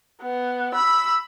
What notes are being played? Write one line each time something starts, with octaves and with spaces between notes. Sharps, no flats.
B3
B5 E6